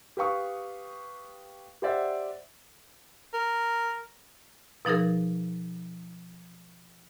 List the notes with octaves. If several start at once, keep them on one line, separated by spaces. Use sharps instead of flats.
G4 B4 F5 C#6 D#6
G4 C5 D5 E5 F#5
A#4
B2 F3 D#4 G#4 A#4